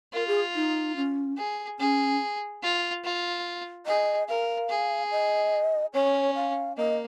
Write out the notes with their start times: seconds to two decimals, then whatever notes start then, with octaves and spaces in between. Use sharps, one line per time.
0.13 F4 A#4
0.28 G#4
0.55 D#4
0.96 C#4
1.38 G#4
1.79 C#4 G#4
2.63 F4
3.04 F4
3.86 G#4 D#5
4.28 A#4 F5
4.70 G#4
5.11 D#5
5.94 C#4 C#5
6.36 F5
6.77 A#3 D#5